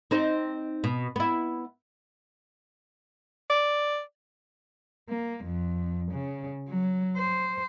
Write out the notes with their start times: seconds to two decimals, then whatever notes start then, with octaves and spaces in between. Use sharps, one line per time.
0.11 C4 D#4 C5
0.84 B2
1.16 B3 E4
3.50 D5
5.09 A#3
5.45 F2
6.12 C#3
6.69 F#3
7.18 C5